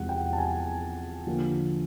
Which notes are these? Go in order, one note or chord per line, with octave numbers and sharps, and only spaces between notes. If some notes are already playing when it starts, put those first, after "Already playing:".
Already playing: E2 C3 F3 G#3 F#5
G5
A5
G#5
D3 F3 A#3 D4